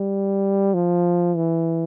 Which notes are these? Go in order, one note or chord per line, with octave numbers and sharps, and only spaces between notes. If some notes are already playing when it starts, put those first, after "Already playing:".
Already playing: G3
F3
E3